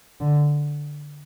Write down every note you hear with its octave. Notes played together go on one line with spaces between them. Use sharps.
D3